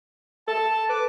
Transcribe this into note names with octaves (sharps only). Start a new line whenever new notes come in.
A4 A5
B4 D6